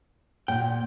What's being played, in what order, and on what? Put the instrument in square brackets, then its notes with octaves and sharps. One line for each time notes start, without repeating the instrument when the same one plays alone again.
[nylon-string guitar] A#2 F#5 [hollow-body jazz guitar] G5